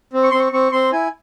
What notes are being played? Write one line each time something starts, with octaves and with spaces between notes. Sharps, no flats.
C4
C#6
C4 C6
C#6
C4 C#6
C4 C6
E4 G#5